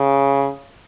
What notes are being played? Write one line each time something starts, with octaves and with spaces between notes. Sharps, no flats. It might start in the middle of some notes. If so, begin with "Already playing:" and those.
Already playing: C#3